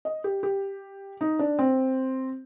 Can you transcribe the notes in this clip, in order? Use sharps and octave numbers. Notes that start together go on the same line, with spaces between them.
D#5
G4
G4
D#4
D4
C4